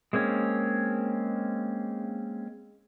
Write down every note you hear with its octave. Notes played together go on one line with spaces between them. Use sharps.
G#3 A#3 C4 C#4